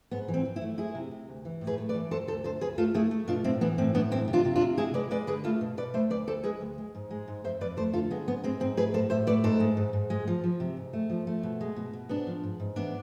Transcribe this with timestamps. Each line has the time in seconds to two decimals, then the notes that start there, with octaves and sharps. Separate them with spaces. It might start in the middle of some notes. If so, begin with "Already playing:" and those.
0.11 G#2 B3
0.28 E3
0.34 C4
0.45 E3
0.56 C4 E4
0.61 A3
0.78 G#3 E4 G#4
0.95 C3
1.12 C3
1.28 D2
1.45 E3
1.61 A2
1.67 G#4 B4
1.78 A3
1.89 B4 D5
1.94 E3
2.11 D2 A4 C5
2.27 D2 A4 C5
2.44 D2 A4 C5
2.61 D2 G#4 B4
2.78 A3 F4 A4
2.94 A3 E4 G#4
3.11 A3
3.28 B2 D4 F4
3.44 A2 C4 E4
3.61 E3 B3 D4
3.78 A2 C4
3.95 A2 B3 D4
4.11 E2 C4 E4
4.28 C3
4.33 D4 F4
4.45 C3
4.56 D4 F4
4.61 C3
4.77 G#3 E4 G#4
4.94 G#3 B4 D5
5.11 G#3 B4 D5
5.27 D3 G#4 B4
5.44 A3 F4 A4
5.61 B2
5.77 B2 B4 D5
5.94 A3 C5 E5
6.10 D2 B4 D5
6.27 D2 A4 C5
6.44 G#3 G#4 B4
6.61 D2
6.78 G#3
6.95 G#2
7.11 G#3
7.28 G#2
7.44 F2 C5 E5
7.61 F2 B4 D5
7.77 A3 A4 C5
7.93 D3 F4 A4
8.11 G#3 B3
8.27 G#2 B3
8.44 G#3 C4
8.60 G#2 C4
8.77 A3 G#4 B4
8.94 A2 A4 C5
9.10 A2 C5 E5
9.27 A3 B4 D5
9.44 G#2 A4 C5
9.60 G#3
9.77 G#2
9.93 G#2
10.10 G#3
10.28 F3
10.44 F3
10.60 C3
10.77 G#2
10.93 A3
11.10 F3
11.27 A3
11.43 B2
11.61 G#3
11.76 B2
11.93 B2
12.09 G#2 B3 D4
12.27 F3
12.44 G#2
12.60 G#2
12.76 E3 B3 D4